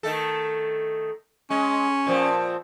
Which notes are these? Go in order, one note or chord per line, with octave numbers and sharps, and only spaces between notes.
D#3 A3 A4
G#3 C#4
A#2 F3 C4